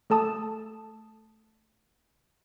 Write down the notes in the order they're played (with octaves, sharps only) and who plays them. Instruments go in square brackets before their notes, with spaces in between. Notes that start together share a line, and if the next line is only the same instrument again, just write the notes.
[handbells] A3 A4 A5 D#6